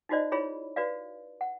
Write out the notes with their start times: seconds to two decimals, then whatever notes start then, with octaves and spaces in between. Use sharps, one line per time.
0.09 D#4 F4 F#4 C5 D5 D#5
0.32 E4 F4 G#4 C#5 B5
0.76 F#4 B4 D5 F5
1.41 F#5